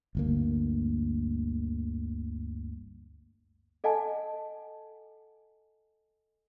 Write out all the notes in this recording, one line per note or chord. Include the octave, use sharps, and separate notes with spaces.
G1 D2 A#3
A4 D#5 F#5 G#5 A5